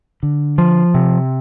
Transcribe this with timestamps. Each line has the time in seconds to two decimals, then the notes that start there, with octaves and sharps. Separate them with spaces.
0.23 D3
0.58 F3
0.94 C3